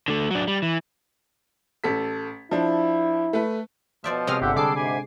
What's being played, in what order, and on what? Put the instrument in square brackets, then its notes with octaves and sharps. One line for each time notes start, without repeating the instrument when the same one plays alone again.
[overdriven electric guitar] D3 A3
F#3 D4
G3
E3
[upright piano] A1 A4 B6
[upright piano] F3 D4 [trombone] E4
[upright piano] A3 B4
[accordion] B2 [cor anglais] F3 [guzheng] C5 D5 E5
[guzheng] C3 G#3 C4 [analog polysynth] D#6 F6
[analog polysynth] G1 [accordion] D3 E5 F#5 [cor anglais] G4
[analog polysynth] D3 D6 C7 [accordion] G3 D4 G#4 [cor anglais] A4
[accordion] G#2 C3 B5 [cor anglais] G#5